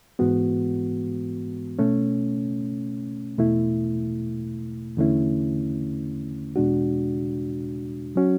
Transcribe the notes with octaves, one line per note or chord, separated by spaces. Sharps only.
G#2 E3 G#3 B3 F#4
B2 A3 C#4
E2 B2 A3 E4
E2 D3 A3 C#4 E4
E2 B2 G#3 D4 F#4
F#3 C#4 F#4